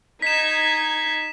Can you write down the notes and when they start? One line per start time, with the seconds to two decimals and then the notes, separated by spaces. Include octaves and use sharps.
0.22 D#4 G#6 B6 E7